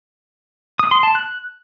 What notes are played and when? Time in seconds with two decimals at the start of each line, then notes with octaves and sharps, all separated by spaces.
0.79 D#6
0.91 C6
1.03 A5
1.15 F#6